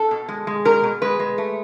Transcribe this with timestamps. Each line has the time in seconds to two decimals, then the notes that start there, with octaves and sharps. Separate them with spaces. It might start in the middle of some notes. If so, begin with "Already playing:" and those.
Already playing: A4
0.11 B2
0.28 G#3
0.47 G#3
0.65 B2 A#4
0.83 B2
1.02 G#3 B4
1.20 G#3
1.38 A3